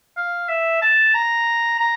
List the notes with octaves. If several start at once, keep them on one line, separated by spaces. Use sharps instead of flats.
F5
E5
A5
A#5
A#5